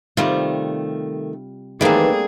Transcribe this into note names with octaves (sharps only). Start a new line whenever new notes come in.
C3 D#3 G3 A3 F4
D#3 E3 G3 A3 A#3 C4 D4 G#4